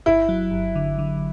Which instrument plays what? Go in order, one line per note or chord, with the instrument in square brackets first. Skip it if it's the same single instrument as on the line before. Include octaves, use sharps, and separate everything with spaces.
[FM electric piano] G1 [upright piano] E4
[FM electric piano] F#3
G1
D3
D3